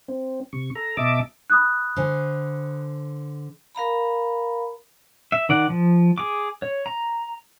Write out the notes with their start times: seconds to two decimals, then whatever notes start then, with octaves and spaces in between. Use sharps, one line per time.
0.08 C4
0.53 C3 C#6
0.75 A4 A#5
0.97 B2 D#5 E5 A5 D6
1.50 B5 D#6 F#6
1.96 D3 C5 G#5
3.75 A#4 F5 A#5 B5
5.32 E5
5.49 D#3 D5 F#5
5.69 F3
6.18 G#4 D6
6.62 C#5
6.86 A#5